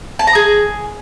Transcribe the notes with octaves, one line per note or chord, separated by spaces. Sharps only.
A5
A#5
G#4